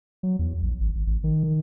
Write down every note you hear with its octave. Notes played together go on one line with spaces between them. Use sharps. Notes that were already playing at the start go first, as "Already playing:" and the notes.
F#3
E2
A#1
G#1
G#1
A1
D#3
D#3